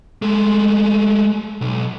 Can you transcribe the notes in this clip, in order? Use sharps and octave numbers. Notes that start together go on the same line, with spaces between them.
G#3 A3
B1